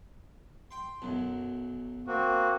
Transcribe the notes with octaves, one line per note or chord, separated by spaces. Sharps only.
G5 C6
B1 F#2
A#3 C4 F#4